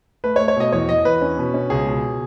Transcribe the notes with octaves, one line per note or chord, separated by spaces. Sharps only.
A3 B4
C#5
A3
C#5
B2 D#5
E2 C#5
E2 D#5
E2 B4
C#4
B2
C#4
C#2 G#4
B2